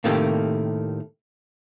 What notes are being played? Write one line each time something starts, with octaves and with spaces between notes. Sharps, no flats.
A2 C3 D#3 A3 A#3 G4